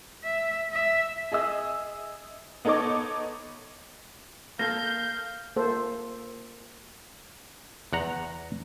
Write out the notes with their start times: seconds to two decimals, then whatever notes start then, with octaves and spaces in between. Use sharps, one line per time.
0.23 E5
0.72 E5
1.32 G#4 D#5 E5 E6
2.65 B3 D#4 A4 C#5 D#5 D6
4.59 A#3 A4 F5 G6 A#6
5.56 A#3 A4 C5
7.93 E2 F#5 A#5